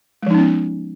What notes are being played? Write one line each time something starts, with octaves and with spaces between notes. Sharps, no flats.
F3 G#3 B3 C#4 D#4